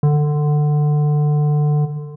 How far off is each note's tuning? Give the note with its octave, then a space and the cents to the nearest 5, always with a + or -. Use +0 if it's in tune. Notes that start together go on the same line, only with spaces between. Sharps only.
D3 +20